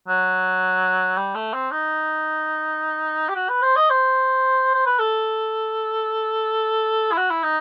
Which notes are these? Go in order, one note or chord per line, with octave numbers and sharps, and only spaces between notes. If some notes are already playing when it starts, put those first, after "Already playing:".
F#3
G3
A3
C4
D#4
G4
F#4
B4
C5
D#5
C5
C5
B4
A4
E4
F#4
E4
D#4